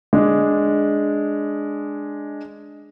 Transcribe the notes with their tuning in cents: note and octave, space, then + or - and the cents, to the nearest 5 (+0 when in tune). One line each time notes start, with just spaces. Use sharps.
G#3 +0 D4 +0